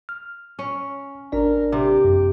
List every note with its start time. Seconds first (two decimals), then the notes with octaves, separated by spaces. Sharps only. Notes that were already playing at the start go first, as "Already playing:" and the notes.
0.09 F6
0.59 C#4
1.32 G#1 D4 A#4 D5
1.72 C3 G4
2.05 F#2